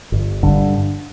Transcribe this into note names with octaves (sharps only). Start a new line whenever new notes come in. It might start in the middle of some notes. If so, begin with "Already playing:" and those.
G1
G2 D3